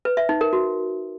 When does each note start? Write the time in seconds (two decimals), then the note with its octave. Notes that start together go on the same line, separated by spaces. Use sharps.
0.05 B4
0.17 E5
0.29 D#4
0.41 A#4
0.53 F#4